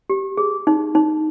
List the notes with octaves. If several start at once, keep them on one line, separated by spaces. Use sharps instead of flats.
G4
G#4
D#4
D#4